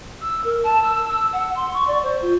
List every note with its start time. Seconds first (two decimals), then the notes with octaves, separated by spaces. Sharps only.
0.21 E6
0.44 A#4
0.63 A5
0.83 E6
1.09 E6
1.33 F#5
1.55 C6
1.73 C#6
1.87 D5
2.03 C5
2.22 F4